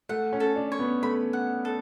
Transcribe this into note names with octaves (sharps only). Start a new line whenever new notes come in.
A3 F#5
C#4
A4
D4
C#5
B3
A3 B5
F#5
A4